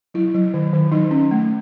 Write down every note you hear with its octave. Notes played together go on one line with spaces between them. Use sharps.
F#3 E4
F#3
D#3
D#3
F#3 D#4
C#4
A3